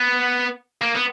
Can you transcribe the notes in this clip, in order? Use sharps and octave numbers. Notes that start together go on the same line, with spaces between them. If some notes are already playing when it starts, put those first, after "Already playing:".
Already playing: B3
A#3
B3